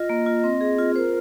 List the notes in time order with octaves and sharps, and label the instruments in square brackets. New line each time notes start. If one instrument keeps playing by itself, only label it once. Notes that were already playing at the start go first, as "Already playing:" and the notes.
Already playing: [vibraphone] F4 [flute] D#5
[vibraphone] A#3
F4
C4
G#4
F4
[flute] A#4 [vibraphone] C5